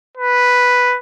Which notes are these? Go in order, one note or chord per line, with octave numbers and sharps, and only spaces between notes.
B4